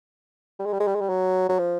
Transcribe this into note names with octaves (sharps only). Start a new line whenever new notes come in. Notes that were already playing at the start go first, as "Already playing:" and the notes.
G3
G#3
G3
G#3
G3
G#3
G3
F#3
F#3
F3